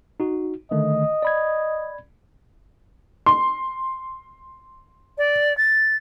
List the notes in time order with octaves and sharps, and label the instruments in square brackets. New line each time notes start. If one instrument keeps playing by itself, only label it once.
[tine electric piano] D#4 F#4
[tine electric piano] D3 D#3 A3 [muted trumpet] D#5
[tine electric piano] D5 B5 G#6
[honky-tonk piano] C6
[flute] D5
A6